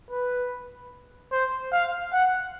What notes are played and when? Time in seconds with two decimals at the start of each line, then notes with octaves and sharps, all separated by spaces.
0.11 B4
1.32 C5
1.72 F5
2.13 F#5